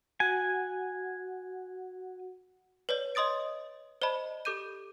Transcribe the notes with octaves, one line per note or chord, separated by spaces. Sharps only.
F#4 F#5 G#5
B4 C#5 D5
C#5 D#5 C6 D#6 A6 D7
C5 D5 D#5 A5 B5
G4 A4 D6 G6 D#7